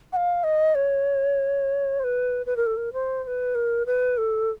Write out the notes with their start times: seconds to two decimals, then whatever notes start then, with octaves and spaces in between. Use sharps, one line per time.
0.13 F#5
0.16 F5
0.44 D#5
0.75 C#5
1.99 C5
2.04 B4
2.46 B4
2.57 A#4
2.66 A4
2.77 A#4
2.93 C5
3.24 C5
3.27 B4
3.55 A#4
3.86 B4
4.18 A4